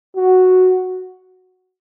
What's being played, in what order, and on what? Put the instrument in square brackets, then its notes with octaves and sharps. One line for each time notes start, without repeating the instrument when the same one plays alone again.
[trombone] F#4